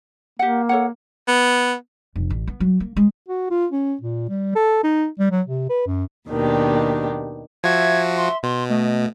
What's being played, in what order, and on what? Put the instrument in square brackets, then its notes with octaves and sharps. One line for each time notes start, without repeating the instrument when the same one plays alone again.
[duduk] A#3 [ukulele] G4 F#5
[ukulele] A4 C#5 F#5
[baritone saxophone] B3
[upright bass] F1
A1
B3
F#3
A#3
G#3
[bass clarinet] F#4
F4
C#4
A#2
G3
A4
D#4
G3
F#3
C3
B4
F#2
[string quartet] D#2 B2 D#3 D4 G4
[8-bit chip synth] F3 F#4 [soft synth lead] E5 [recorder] G#6
[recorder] C6
[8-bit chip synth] B2 [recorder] C6
[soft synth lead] A3 [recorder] D#5